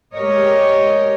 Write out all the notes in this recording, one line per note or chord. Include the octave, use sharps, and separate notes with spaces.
G#3 G4 A#4 C#5 D#5